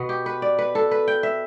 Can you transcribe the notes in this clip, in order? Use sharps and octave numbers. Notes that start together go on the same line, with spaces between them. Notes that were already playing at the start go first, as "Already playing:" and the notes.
Already playing: B2 B3
G4
B4
D5
B4
A4
B4
G5
E5